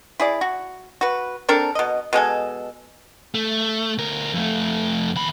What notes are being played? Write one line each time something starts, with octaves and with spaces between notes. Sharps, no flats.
E4 G#4 D5
F#4
F#4 B4
C4 D4 A4 A#4
B2 D#5
B2 G#3 A4 G#5
A3
D2 A#4
F2 A3
D#2 B5